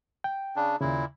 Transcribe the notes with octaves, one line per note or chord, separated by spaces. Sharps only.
G5
C#3 D4
D#2 A#2 C#3 E4